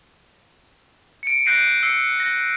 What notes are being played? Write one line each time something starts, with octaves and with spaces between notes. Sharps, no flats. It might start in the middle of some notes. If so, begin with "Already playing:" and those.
C#7 D7
F#6 G6 A#6 C7 D7 D#7
E6 C7 C#7
A#6